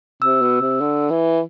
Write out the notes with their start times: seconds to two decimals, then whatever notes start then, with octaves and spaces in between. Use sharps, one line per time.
0.22 C3 E6
0.41 B2
0.61 C3
0.81 D3
1.10 E3